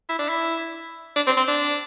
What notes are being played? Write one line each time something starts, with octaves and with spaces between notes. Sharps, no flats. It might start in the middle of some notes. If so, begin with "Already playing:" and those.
E4
D4
E4
D4
C4
C4
D4